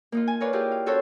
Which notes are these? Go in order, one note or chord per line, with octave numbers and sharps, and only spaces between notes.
A#3 D#4 F4
G#5
A#4 B4 C#5 D5 F5
E4 F4 G4 G#4 A#4 D5
F5
C#4 F#4 A4 A#4 C5 C#5